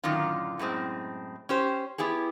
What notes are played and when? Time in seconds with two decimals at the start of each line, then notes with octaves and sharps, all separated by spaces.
0.04 F#2 A2 D3 D#3 F4
0.59 F#2 A2 G#3 C4
1.49 C#4 G4 C5
1.98 B3 E4 G4 G#4